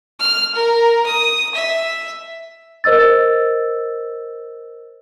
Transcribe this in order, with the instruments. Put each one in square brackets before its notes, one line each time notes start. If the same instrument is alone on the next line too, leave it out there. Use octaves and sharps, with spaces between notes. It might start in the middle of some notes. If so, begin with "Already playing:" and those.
[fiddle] F6
A#4
D#6
E5
[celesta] A#4 C5 D#5 E6 A6